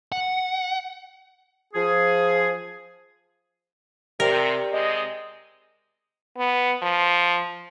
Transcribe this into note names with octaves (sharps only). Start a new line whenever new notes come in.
F#5
F3 G#4
C3 G4 A#4 D5 G5
C3 G#3 D#5
B3
F3